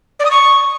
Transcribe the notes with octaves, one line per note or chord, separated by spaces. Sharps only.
D5
D#6
C#6